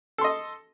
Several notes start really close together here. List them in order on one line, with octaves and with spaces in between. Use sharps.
A4 C6 D#5